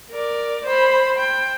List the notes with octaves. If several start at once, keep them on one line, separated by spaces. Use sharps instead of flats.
A#4 D5
C5 B5
G5